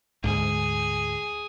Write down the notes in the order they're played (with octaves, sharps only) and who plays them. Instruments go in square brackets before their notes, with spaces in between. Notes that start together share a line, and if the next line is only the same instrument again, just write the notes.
[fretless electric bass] D2 G#2 [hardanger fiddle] G#4